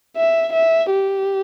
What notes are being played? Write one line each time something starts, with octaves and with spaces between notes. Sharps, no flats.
E5
E5
G4